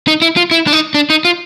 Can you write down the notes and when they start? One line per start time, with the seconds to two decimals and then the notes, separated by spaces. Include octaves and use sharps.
0.08 D#4
0.22 E4
0.37 F4
0.51 E4
0.67 D4
0.73 D#4
0.94 D4
1.10 D#4
1.25 F4